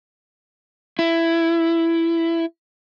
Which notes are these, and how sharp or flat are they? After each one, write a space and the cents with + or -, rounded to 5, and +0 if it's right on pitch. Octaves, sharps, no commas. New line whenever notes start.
E4 +15